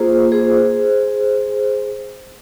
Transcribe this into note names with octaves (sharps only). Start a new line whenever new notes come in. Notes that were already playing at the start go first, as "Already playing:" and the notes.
Already playing: A#3 F4 G#4 C5
G#4 C5